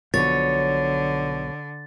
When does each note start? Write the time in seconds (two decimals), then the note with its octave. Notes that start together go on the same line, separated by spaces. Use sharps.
0.14 B1 B2 D3 F3 C#5 A6